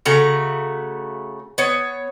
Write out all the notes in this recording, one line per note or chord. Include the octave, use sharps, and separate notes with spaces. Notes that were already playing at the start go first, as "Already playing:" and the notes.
C#3 A3 F#4 A#5
B3 C#5